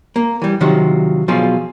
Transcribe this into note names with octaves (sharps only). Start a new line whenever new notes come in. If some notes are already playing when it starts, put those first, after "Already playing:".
A#3
E3 G3
C3 D#3 F3 F#3
B2 F3 F#3 F4 G#4